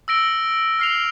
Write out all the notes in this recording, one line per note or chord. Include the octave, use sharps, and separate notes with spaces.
E6 A#6 D7 G7
F6 C7 F7